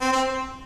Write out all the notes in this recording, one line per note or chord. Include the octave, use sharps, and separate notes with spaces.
C4
C4